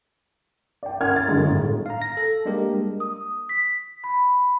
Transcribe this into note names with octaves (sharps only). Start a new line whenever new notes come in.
D5 G5
C#4 A#4 F#5 F6 G#6
A6
F#2 D3 D#3 G#3
G1 A2
F5 A#5
A#6
A4
G3 G#3 A#3 D4 G4 A#4
D#6
B6
B5